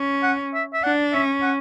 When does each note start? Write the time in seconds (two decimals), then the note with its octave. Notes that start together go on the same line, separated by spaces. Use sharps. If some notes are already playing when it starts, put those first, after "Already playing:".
Already playing: C#4
0.23 F#5
0.54 E5
0.73 E5
0.83 D4 F#5
1.13 C#4 E5
1.42 F#5